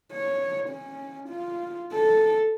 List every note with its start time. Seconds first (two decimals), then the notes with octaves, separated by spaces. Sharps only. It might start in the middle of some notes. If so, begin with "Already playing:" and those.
0.13 C#5
0.70 C#4
1.29 F4
1.93 A4